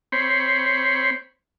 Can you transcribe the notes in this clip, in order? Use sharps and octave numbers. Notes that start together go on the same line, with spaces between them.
C4 C5 C#5 B5